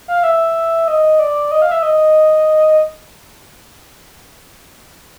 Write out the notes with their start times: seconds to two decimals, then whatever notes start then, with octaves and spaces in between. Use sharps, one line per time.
0.08 F5
0.23 E5
0.88 D#5
1.19 D5
1.51 D#5
1.62 F5
1.71 E5
1.83 D#5